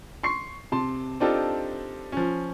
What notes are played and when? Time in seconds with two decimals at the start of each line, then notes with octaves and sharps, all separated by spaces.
0.23 C6 C#6 C7
0.72 C3 A5 C6
1.20 C4 D4 D#4 F4 G4 A4
2.12 F3 C#4